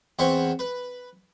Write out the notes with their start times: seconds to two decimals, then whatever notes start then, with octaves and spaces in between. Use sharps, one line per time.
0.19 E2 C4 C5 F#5 B5 C#6
0.59 B4